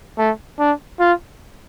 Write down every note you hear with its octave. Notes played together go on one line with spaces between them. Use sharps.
A3
D4
F4